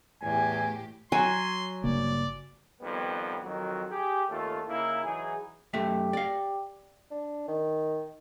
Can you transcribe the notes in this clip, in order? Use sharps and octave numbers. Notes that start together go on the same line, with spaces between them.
E2 A2 G4 G#5
F#3 G#5 C6
G1 C#3 A#3 D5
F2 D#3 G3 B3
F2 D#3 F#3
G4 G#4
D#2 A3 C#4 F4 A4
C#3 A#3 D#4 E4
E3 F#3 D#4 G#4
F#2 A3 G4 E5
D5 F5
D4
D#3